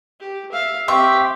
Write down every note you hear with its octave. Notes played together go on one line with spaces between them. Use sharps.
G4
E5 F5
C4 G4 E5 F5 C6 C#6